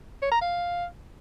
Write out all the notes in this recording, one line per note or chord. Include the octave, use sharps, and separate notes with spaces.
C#5
A#5
F5